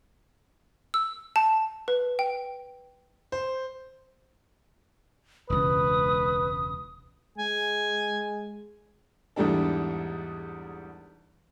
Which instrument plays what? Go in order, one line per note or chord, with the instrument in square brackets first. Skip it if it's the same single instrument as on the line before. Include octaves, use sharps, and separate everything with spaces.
[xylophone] E6
A5
B4
G5
[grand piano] C5
[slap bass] E1 C#2 [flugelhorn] B4 [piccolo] D#6
[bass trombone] G#3 [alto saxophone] G#5
[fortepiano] E2 G#2 G3 D4 A4